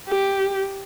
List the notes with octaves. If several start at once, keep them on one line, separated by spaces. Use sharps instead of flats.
G4